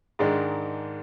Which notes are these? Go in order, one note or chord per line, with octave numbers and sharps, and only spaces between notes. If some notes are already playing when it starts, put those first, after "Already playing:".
G#2 D#3 G#3 D4